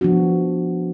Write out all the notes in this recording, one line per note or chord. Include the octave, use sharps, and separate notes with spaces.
F3 B3 D4 F#4